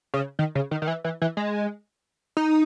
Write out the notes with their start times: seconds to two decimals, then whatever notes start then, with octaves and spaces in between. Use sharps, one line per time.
0.14 C#3
0.39 D#3
0.55 C#3
0.71 D#3
0.82 D#3
0.88 E3
1.04 E3
1.22 E3
1.37 G#3
2.37 D#4